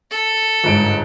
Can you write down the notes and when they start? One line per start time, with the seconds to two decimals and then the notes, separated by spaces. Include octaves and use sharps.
0.11 A4
0.64 G1 G#2 D7